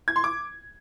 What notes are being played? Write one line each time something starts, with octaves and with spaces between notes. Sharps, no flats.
G#6
C6
D6